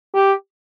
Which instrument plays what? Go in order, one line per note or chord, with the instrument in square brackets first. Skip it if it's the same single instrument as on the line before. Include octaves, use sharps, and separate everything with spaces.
[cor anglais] G4